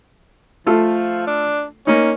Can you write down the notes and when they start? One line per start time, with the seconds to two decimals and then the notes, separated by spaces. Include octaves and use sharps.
0.67 F3 A3 F4 A4
1.27 D4
1.87 A#3 C#4 D#4